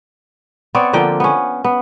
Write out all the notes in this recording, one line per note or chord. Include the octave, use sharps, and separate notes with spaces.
B3 C4 C#5 D5
D3 F3 A#3 G5
B3 C#4
B3